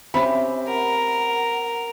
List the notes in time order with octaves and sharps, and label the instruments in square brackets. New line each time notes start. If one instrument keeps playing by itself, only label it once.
[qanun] C4 C#4 G4 [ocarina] E5 [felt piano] B5
[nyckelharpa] A#4 [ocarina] F#5